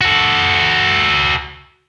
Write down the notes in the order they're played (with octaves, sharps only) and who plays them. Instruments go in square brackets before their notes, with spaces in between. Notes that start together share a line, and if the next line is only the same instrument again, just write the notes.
[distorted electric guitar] F#4 A4